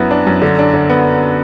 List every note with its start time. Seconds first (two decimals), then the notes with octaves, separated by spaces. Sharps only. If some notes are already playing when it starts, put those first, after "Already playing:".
Already playing: F#2 B3 E4
0.11 D4
0.27 F#2
0.42 D3
0.59 D4
0.74 D3
0.89 B3